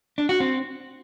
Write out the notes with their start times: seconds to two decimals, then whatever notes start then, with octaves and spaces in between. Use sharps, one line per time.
0.18 D4
0.29 F#4
0.40 C4